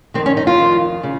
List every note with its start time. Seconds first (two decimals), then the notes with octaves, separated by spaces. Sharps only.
0.14 D#3 C4
0.18 F2
0.26 C#4
0.37 D#4
0.47 F4
0.58 F2 D#3
1.03 C#3